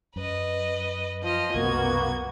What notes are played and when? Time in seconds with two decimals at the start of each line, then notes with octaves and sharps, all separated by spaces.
0.16 F#2 B4 D#5
1.23 F3 D#5 F6
1.54 C2 F#2 B2 A#3 B3 F#4 G#6